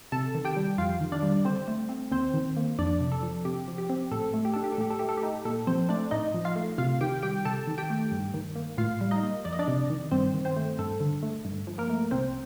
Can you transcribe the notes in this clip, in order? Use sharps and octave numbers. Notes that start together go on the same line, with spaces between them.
C3 A4 A5
D#3
G4 G5
G3
F2 F4 F5
D#3
D4 D5
G3
D3 C4 C5
A3
C4
D#2 C4 C5
D#3
A#3
F2 D4 D5
C3
A4
F3
C3 G4
F3
G4
C4
A2 A4
A3
G4
D4 A4
G4
A4
A2 G4
A4
A3 G4
A4
G4
D#4
A#2 A4
F3 C4 C5
A3 D4 D5
A2 D#4 D#5
F3
F4 F5
A3
C3 F4 F5
D#3 G4 G5
G3 G4 G5
C3 A4 A5
D#3
G4 G5
A3
G2
D#3
A#3
A2 F4 F5
G3
D#4 D#5
A#3
F2 D5
D#5
D4 D5
C3
D#3
G2 C4 C5
D#3
C4 C5
A3
G2 A4
D3
A3
G2
F3
A#3 A#4
A3
C2 C4 C5